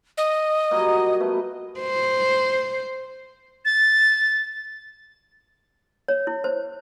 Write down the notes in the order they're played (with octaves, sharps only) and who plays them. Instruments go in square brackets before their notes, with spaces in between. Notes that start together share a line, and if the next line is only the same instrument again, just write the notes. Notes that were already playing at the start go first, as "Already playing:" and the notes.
[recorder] D#5
[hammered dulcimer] A#2 F#3 G3
B2 A3 B4
[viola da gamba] C5
[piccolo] A6
[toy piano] C#5
E4
C5